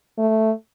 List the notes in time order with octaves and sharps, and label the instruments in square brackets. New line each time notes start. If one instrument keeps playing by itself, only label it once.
[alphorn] A3